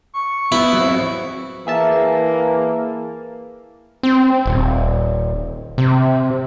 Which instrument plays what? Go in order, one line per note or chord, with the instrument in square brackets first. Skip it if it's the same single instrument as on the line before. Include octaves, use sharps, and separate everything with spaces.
[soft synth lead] C#6
[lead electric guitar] B3 [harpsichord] E4
[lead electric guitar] F#3 C4
[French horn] E3 [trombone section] A#3 [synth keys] G#4 E5 A5
[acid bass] C4
D#1
C3